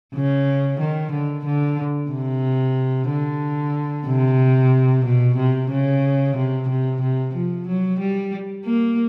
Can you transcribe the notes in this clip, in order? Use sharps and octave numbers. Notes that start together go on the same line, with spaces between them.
C#3
D#3
D3
D3
C3
D3
C3
B2
C3
C#3
C3
C3
C3
F3
F#3
G3
A#3